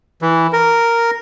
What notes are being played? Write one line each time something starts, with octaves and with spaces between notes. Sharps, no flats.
E3
A#4